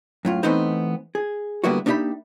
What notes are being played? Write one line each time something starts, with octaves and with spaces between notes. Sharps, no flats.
F#2 A2 F4
E3 A3 B3 C4 D#4 C5
G#4
D3 G3 A#3 B3 E4 F#4
A#3 D4 D#4 G4 E5 B5